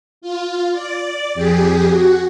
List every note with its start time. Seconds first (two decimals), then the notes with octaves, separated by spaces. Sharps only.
0.22 F4
0.73 D5
1.35 F2 G4 G#4
1.88 F#4